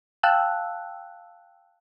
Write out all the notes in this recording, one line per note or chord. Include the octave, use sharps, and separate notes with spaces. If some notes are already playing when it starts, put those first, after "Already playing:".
F5 G5 A5 E6 F#6